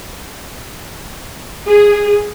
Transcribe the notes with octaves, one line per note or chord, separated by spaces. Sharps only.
G#4